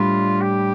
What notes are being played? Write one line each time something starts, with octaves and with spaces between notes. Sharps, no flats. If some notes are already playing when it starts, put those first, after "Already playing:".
Already playing: A2 G3 D4 F4
G4